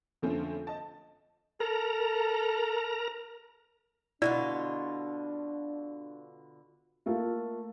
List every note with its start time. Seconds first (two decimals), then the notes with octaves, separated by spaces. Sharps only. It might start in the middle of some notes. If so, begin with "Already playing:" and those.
0.22 F2 D3 F3 A3 C4 C#4
0.67 D#5 A5
1.60 A4 A#4 A#5
4.22 B2 D3 D4 E4 F4 D5
7.06 A3 A#3 F4 A4